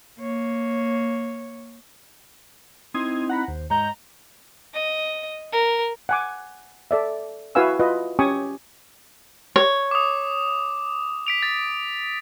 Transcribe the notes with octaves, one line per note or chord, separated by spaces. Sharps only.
A#3 C#5
C4 D#4 E4 C6 D#6 G#6
F#5 A#5 B5
D#2 C5
G#2 C#5 D#5 A#5 G6
D#5
A#4
F#5 G#5 D6
A4 D5 E5
E4 F#4 B4 F5 G#5 E6
F4 B4 D#5
C#4 G4 G#5 C#6 D#6
C#5
D6 D#6
B6 D7 F7
A6